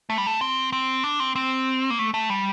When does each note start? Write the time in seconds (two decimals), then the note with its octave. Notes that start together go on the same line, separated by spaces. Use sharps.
0.10 A3
0.18 G3
0.27 A3
0.41 C4
0.72 C4
1.04 D4
1.20 C4
1.35 C4
1.90 A#3
1.99 A3
2.14 A3
2.30 G3